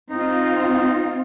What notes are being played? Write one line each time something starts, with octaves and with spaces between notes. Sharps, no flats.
C4 D#4 F4